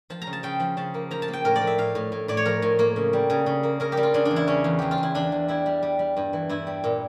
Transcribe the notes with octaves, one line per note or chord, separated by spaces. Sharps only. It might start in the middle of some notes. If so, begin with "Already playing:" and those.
F3 A5
A#5
C#3
A5
C#3 G5
F3
C#3 A5
A#3
F3 A#5
A5
A#3
G5
A2 A#4
D5
F3
E5
A2 F5
A2
A2
A2 D5
C#5
F3 A#4
A2
A#3
C#3
G3
C#3
C#3
A#3
C#3 A#4
G4
G3
F4
C#3 D4
D4
E2
E4
C#3 C#4
E2
E2 G4
F4
E2 E4
E2 D4
E2
G3 E4
G3
G3
G3
G2
E3
G2 E4
G3
A#2